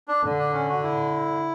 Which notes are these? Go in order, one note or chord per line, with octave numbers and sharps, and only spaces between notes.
D4
D3
D4
C#4
F#4
E4